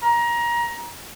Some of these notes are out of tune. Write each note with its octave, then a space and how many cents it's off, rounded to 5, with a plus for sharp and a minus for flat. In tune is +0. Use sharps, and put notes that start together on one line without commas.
A#5 +25